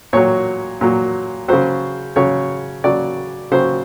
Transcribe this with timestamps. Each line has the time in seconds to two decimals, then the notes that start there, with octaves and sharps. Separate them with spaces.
0.13 A#2 F#3 C#5
0.81 A#2 F#3
1.48 C#3 F#3 C5
2.16 C#3 F#3 C#5
2.84 C#3 F#3 D5
3.51 C#3 F#3 C5